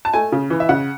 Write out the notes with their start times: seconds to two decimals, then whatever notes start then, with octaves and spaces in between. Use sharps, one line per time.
0.05 A5
0.13 A3 G#5
0.32 C#3
0.50 E3
0.60 E5
0.69 C#3 F#5